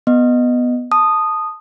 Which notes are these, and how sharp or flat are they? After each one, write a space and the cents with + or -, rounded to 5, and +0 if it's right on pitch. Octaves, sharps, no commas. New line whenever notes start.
B3 +0 D#5 -10
A5 +0 D#6 -10